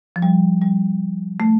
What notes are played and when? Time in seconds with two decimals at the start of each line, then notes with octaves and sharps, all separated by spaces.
0.16 F3
0.22 G3
0.61 G3
1.40 A3